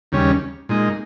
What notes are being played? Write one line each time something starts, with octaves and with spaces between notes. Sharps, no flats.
D#2 C#3 G3 C#4
A#2 G#3 D#4